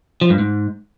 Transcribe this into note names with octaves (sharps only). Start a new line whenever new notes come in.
F3
G2
G#2